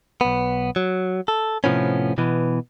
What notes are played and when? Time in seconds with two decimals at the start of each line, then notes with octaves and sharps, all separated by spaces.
0.21 B1 B3
0.76 F#3
1.28 A4
1.64 A2 C3 D#3 F3 B3 C#4
2.18 B2 E3 B3